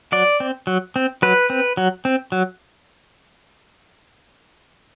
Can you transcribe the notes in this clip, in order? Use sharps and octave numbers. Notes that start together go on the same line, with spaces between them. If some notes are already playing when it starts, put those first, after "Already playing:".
F#3 D5
C4
F#3
C4
F#3 B4
C4
F#3
C4
F#3